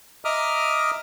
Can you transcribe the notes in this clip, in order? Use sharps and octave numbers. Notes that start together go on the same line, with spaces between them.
D#5 E5 A#5 D6 D#6 F6